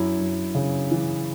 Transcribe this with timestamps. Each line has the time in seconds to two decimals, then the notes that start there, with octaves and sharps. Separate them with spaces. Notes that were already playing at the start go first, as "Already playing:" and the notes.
Already playing: F#2 E4
0.19 F#2
0.55 C#3
0.91 E3